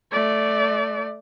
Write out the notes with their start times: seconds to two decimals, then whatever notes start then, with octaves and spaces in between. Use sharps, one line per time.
0.12 A3 D5